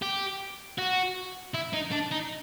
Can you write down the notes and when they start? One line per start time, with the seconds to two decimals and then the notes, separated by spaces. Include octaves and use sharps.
0.02 G4
0.78 F#4
1.55 E4
1.74 D#4
1.92 D4
2.12 D#4